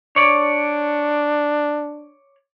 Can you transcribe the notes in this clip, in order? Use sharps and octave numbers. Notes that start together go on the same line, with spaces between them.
D4 C#5 D5